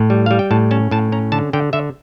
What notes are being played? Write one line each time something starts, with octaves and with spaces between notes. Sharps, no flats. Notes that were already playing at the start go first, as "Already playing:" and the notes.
Already playing: A2
G3
G3 F5
G5
A2 A5
C#4 A5
A2 A5
C#4 A#5
D3 A5
D3 G5
D3 E5